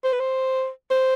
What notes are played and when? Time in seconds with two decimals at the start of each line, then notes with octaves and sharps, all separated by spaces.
0.04 C5
0.13 B4
0.20 C5
0.90 C5